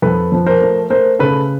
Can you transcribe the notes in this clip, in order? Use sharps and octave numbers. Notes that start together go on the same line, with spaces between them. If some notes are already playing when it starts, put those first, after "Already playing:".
F2 A4 B4
F3
A#4 C5
A3
A3 A#4 C5
C#3 A4 B4